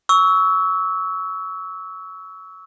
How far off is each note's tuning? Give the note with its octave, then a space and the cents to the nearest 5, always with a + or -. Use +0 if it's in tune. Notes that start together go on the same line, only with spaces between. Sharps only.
C#6 +25 E6 -15